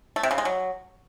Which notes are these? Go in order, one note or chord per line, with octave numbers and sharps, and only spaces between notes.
A3
C3
C#3
G#3
F#3